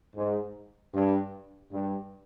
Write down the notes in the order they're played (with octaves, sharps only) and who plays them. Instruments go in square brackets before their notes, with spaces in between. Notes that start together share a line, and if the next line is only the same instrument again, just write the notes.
[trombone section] G#2
G2
G2